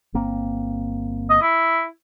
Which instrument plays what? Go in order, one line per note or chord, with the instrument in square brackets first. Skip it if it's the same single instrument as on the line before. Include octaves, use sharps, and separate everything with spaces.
[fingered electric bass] G1 A#3 C4
[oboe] D#5
E4